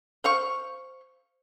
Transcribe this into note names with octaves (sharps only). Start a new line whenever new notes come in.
C5 F5 C#6